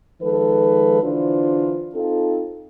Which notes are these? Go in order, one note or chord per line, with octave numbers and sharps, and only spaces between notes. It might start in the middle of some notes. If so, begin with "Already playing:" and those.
D#3 F3 G#3 A4 B4
D3 E3 D4 F4 C5
C4 D#4 F4 A4